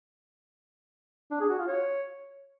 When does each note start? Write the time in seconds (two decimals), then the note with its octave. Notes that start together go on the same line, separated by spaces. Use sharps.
1.31 D4
1.40 G#4
1.49 F#4
1.58 F4
1.68 C#5